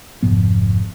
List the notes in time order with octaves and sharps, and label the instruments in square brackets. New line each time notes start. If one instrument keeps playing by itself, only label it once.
[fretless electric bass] F1 G#2 F3 B3